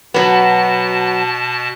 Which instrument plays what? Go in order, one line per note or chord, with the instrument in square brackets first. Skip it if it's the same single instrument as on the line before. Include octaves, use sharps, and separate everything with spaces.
[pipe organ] B2 A5 [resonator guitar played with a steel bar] F#3 B3